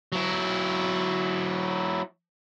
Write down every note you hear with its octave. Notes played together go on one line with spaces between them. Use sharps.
F#3 E4